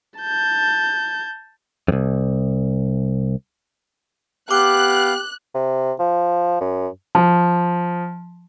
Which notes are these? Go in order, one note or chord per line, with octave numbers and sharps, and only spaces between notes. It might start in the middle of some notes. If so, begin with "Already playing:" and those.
A5 G6
C2 F2
B3 G4 F5 D6 F#6
C3
F3
F#2
F3